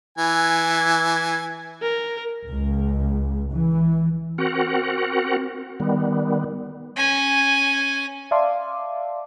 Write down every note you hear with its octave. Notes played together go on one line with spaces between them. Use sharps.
E3 G#5
A#4
C#2
E3
C4 F#4 A#4 F#5
D#3 G3 B3
C#4 G#5
D5 E5 F5 A5 C6 D6